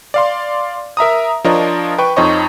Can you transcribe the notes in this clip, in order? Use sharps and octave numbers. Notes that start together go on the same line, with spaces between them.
D5 F5 C6
A#4 E5 A#5 D#6
F3 D4 F4 A#4 C#5 D#5
B4 G5 C#6
F2 D#4 C5 C#5 D#5 C#6